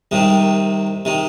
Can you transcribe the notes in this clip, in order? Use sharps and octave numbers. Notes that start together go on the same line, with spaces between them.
C2 C3 D#3
C3 D#3